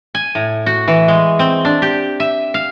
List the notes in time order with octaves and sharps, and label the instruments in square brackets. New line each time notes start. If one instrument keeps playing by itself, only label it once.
[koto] G#5
A2
F#4
E3
G#3
C4
D4
G4
E5
F5